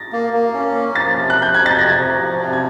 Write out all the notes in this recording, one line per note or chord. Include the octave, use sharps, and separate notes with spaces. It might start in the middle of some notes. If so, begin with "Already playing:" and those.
Already playing: A6 A#6
A#3
A#3
C#4
A#3
F3 A6
C3
F#6
F3
G6
F2 G#6
A6
C3 A#6
F3
F3
C3
G#6